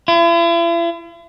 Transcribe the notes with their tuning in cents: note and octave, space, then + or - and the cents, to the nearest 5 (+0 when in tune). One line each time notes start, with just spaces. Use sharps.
E4 +45